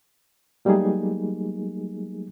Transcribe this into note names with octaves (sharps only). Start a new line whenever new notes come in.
F#3 G3 A3 A#3 D#4 G#4